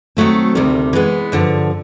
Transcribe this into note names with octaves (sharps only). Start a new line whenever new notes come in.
D#3 F#3 A3 C4
D2 C3 D#3 G3
E3 G#3 B3
G2 D3 F3